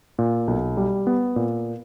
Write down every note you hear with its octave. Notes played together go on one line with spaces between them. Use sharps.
A#2
B1
G3
B3
A#2